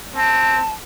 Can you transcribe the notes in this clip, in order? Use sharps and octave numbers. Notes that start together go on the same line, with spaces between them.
C4 A5